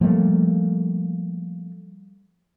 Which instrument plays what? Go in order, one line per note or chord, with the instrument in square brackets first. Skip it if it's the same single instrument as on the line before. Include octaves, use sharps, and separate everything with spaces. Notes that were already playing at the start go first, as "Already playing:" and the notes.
[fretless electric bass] F3 G3 A3 A#3